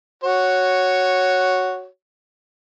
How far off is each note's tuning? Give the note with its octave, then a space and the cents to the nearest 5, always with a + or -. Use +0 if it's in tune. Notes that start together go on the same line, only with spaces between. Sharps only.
F#4 +0 C#5 +0